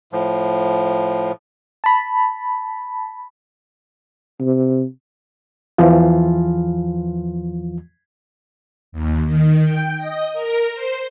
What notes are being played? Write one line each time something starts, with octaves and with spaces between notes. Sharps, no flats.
A2 F3
A5 B5
C3
E2 E3 F3 F4
D#2
D#3
G5
D#5
A#4
C5